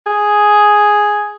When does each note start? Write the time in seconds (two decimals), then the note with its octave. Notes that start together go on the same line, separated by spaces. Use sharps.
0.07 G#4